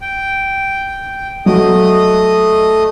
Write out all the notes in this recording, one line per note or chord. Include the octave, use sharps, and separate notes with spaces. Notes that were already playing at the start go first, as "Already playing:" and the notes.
G5
F#3 A3 D#5 D#6